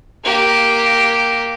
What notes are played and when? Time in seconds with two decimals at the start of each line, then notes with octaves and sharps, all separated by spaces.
0.24 A#3 G4